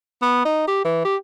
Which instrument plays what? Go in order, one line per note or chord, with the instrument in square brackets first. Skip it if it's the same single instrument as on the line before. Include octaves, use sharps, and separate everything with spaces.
[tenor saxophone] B3
D#4
G4
E3
G4